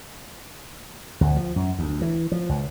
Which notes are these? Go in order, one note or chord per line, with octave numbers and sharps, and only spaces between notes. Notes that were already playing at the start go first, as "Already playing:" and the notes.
D2
F3
F#2
D2
E3
F3
C#2